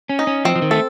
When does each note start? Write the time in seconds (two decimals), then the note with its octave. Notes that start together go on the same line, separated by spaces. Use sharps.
0.09 C#4
0.19 D#4
0.27 C#4
0.45 F3 C4
0.56 F3
0.62 D#3
0.71 A3 A4